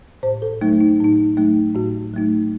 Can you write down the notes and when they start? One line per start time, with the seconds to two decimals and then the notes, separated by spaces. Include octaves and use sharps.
0.23 A2 C5
0.42 A4
0.61 F#3 A3 D#4
0.81 D#4
1.00 A2 D#4
1.37 F#3 A3 D#4
1.75 A2 F#4
2.14 F#3 A3 D#4